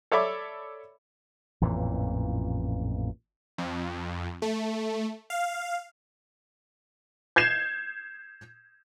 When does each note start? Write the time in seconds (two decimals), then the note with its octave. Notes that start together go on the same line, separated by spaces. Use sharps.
0.12 A4 C#5 D5 E5 B5 D6
1.61 A1 F2 A#2 E3
3.58 F2
4.42 A3
5.30 F5
7.36 G6 G#6 C7 E7